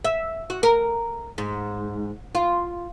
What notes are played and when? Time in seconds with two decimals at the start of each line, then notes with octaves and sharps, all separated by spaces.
0.05 E5
0.50 F#4
0.63 A#4
1.38 G#2
2.35 F4